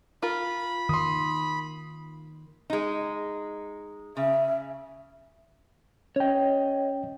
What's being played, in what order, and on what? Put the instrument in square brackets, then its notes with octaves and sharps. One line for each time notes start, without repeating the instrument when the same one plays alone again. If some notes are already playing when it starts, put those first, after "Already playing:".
[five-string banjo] F4 A#4 [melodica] B5
[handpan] D#3 [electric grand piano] C6 D#6
[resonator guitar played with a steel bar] G#3 D#4
[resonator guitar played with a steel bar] C#3 [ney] E5
[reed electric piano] C#4 G5 [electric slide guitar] C#5 D#5